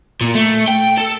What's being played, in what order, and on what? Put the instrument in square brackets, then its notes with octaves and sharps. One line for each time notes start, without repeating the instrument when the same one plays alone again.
[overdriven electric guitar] A#2
A3
G5
A4